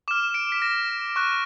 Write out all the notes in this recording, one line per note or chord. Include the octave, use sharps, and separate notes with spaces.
D6 F6 E7
D7
B6
A#6
C#6 F#6